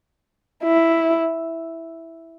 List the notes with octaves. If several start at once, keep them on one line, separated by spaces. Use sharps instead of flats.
E4